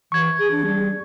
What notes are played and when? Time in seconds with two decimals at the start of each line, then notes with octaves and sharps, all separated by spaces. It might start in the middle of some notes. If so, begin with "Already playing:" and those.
0.12 E3 C#6 G#6
0.38 G#4
0.51 D4
0.66 G3